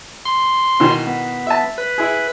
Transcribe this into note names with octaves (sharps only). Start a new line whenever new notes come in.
C6
B2 D#3 E3
B3
E5 A5
B4
E4 G#4